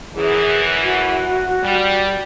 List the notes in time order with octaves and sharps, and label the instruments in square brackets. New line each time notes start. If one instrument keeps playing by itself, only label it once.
[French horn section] F#2 E3 [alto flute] G#4
[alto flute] F#4
[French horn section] G3